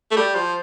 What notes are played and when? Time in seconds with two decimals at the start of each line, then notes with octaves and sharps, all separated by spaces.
0.11 A3
0.16 G3
0.35 F3